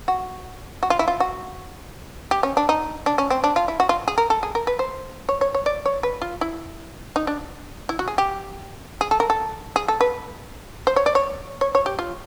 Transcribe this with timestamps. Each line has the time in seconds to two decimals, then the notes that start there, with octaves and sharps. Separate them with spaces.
0.08 F#4
0.83 F#4
0.90 F4
0.99 E4
1.08 F4
1.20 F#4
2.31 G4
2.43 C#4
2.57 D4
2.69 D#4
3.06 D4
3.18 C#4
3.30 C4
3.44 D4
3.56 F4
3.68 E4
3.80 F#4
3.89 F4
4.08 G#4
4.18 A#4
4.30 A4
4.43 G#4
4.55 A#4
4.67 B4
4.79 C5
5.29 C#5
5.41 C#5
5.55 C#5
5.66 D5
5.86 C#5
6.03 B4
6.22 F4
6.41 E4
7.16 D#4
7.27 D4
7.89 E4
7.99 F#4
8.08 G#4
8.18 G4
9.01 G#4
9.11 A4
9.20 A#4
9.30 A4
9.76 G#4
9.88 A4
10.01 B4
10.87 C5
10.96 C#5
11.06 D5
11.15 C#5
11.61 C#5
11.75 C#5
11.86 G4
11.99 F4